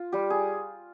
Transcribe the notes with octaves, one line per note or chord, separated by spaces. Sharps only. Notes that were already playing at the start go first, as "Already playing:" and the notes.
Already playing: F4
G3 G4
G#4